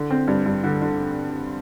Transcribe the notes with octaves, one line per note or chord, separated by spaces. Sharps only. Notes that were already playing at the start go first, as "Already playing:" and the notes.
Already playing: D3
C4
G2
G2
D3
D3